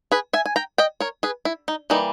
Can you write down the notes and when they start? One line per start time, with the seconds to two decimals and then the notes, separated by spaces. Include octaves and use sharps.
0.12 G#4 B4
0.33 E5 G#5
0.46 G#5
0.56 G5 A#5
0.78 D#5 G5
1.00 A#4 C#5
1.23 G#4 B4
1.45 E4
1.68 D#4
1.90 E3 G3 A#3 D#4